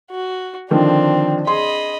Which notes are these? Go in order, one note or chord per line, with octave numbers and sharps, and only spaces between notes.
F#4
D3 D#3 F3 C4 D4
G#4 D#5 B5 C6